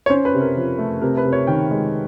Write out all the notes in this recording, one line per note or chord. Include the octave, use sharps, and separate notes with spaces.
C#5
C#4 C5
B4
C3
A#4
F3
A3
C3 A#4
B4
C3
C#5
D#3 G5
G#3